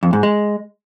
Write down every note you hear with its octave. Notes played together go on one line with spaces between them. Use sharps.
F2
G#2
G#3